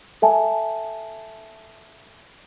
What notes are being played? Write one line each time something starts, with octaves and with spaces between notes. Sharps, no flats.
A4 E5 G#5 A5